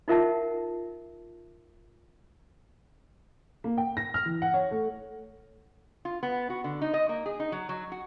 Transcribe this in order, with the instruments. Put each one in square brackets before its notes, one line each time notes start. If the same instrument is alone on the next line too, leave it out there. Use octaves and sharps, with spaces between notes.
[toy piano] D#4 F4 A#4 E5 F#5 A5
[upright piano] A#3
G5
A#6
F6
E3
F#5
C#5
A3
[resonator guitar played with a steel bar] F4
B3
F#4
D3
D#4
D#5
A#3
G#4
D#4
F#3
F#3
F#4